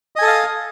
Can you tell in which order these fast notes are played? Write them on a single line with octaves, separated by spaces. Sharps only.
D#5 G#5 A4 D#6 F5